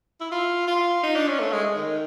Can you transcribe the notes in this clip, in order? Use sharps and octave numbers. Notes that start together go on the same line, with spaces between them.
E4
F4
F4
D#4
D4
C#4
A3
G#3
D#3